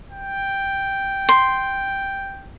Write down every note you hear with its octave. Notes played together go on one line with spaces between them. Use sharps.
G5
C6